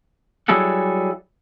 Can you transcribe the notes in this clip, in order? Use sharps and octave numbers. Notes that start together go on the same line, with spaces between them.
F#3 G3 E4 G#4 A4 F#5